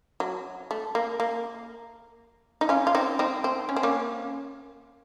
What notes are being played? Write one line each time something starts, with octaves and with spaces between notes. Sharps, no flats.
F#3
A3
A#3
A#3
D#4
C#4 F4
F4
C4 D#4
C4 D#4
C4
C#4
C4
A#3 C#4